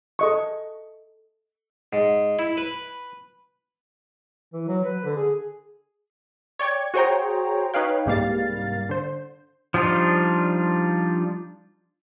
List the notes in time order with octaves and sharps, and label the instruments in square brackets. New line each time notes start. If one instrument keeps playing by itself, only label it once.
[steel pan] A4 D#5 C#6
[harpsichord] G#2
E4
B4
[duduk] E3
F#3
B4
D3
G#4
[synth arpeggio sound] C#5 D5 G5 G#6
F#4 G#4 C5 C#5 G5 A#5
D#4 B4 C#5 F5 G5
C2 G#2 G3 A#3 F5 A6
D3 C5
[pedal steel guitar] F3 G3 D4 D#4 F4